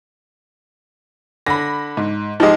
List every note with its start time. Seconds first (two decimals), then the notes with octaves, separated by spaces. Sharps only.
1.46 D3 B5 A#6
1.97 G#2
2.40 F3 G#3 D#4 G4 D#5